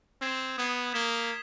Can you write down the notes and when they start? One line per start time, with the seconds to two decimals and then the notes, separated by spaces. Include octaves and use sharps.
0.21 C4 G#6 C7 E7
0.58 B3 D#6 G#6 C7
0.94 A#3 G#6 B6 E7 G7